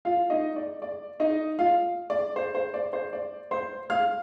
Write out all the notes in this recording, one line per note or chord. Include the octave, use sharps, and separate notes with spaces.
F4 F5
D#4 D#5
D5
D5
D#4 D#5
F4 F5
D5
C5
C5
D5
C5
D5
C5 C6
F5 F6